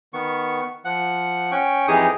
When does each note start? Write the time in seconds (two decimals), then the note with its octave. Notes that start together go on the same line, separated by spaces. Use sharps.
0.13 D#3 B3 C#6
0.85 F3 F#5
1.51 C#4 G5 C#6
1.88 F2 E3 D#4 G4 G#4 D#6